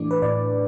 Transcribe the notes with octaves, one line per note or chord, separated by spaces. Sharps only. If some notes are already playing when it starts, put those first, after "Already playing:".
Already playing: A2 E3 A3 D4 D6
B4
A2 D5